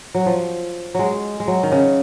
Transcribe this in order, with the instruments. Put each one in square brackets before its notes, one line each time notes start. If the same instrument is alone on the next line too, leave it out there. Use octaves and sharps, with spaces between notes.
[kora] F#3
F3
F#3 G#3
G#3
F#3
D#3
C#3